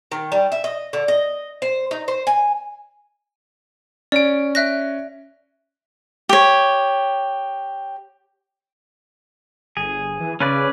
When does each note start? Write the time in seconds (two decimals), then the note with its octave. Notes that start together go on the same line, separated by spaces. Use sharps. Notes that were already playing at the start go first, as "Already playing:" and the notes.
0.12 D#3
0.32 G3
0.52 E5
0.64 D#5
0.93 D3
1.08 D#5
1.62 C5
1.91 D#4
2.08 C5
2.27 G#5
4.12 C#4 D5 D7
4.55 E5 F#6 A#6
6.29 G4 C#5
9.77 G1 G#4
10.20 E3
10.40 C#3 C#4 B4 D5